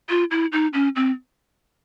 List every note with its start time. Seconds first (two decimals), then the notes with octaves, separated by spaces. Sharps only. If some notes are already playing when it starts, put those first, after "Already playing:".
0.09 F4
0.31 E4
0.52 D#4
0.74 C#4
0.96 C4